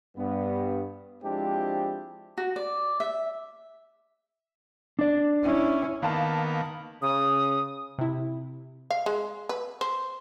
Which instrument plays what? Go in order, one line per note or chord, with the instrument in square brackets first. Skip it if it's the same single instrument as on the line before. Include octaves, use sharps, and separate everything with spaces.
[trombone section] G2 B3
F3 G#3 C4 D4 E4 G4
[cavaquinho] F#4
D5
E5
[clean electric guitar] D4 D5
[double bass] C#4 E4
[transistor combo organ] D#3 A#3 B3 [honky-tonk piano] F5 A5
[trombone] C#3 [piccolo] D#6
[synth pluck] C3 E4
[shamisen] F5
G#3
B4
C5